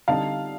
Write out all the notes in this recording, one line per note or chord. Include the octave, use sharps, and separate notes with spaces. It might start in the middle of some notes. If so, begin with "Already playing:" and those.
D3 G3 C4 D#4 F5 A5